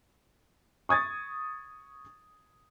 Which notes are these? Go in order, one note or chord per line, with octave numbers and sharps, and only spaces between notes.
C#6 D#6 G#6 A6